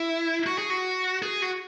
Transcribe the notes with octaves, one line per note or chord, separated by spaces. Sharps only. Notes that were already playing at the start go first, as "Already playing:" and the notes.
Already playing: E4
F#4
G#4
F#4
G#4
F#4